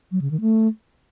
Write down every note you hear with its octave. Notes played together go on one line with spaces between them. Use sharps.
F#3
C#3
D#3
A3